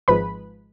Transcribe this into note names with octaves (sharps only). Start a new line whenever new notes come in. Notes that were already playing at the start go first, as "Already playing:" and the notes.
G#1 G#2 F3 G#3 B4 B5